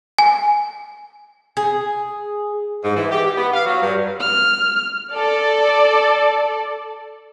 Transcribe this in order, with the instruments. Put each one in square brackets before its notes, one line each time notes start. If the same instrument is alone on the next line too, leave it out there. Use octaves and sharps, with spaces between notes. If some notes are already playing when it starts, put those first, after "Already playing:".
[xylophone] G#5
[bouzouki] G#4
[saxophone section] G#2
E3
G4
G4
B3
F5
F#3
G2
[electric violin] F6
[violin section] A4 D5